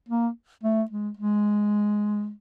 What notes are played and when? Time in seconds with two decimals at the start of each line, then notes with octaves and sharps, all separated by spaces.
0.09 A#3
0.63 A3
0.91 G#3
1.17 G#3